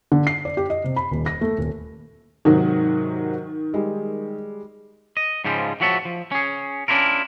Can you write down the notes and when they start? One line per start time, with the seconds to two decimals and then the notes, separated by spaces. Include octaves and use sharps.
0.12 D3
0.27 C7
0.45 D5
0.57 G4
0.70 D#5
0.84 C3
0.96 B5
1.11 D#1
1.26 A#6
1.41 A3
1.58 D#1
2.45 G#2 C3 D#3 F#3
3.74 G3 G#3
5.17 D#5
5.45 G#2 C#3 F3 G3 G#3
5.80 A2 F3 F#4 C#5 E5 A5
6.05 F3
6.32 C#4 G#4
6.88 C#4 D4 E4 F4 A#4